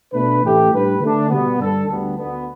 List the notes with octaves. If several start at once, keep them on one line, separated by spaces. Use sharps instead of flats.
B2 A3 D4 B4
A1 A2 A3 G4
A2 G3 D4 G4 B4
D3 A3 D4
B2 G3 B3
G2 D3 G3 D4 A4
D2 D3 G3 B3 D4
D2 D3 B3